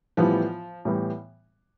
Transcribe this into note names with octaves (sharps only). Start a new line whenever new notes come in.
A2 E3 F3 G3 B3
A2 E3 G3 B3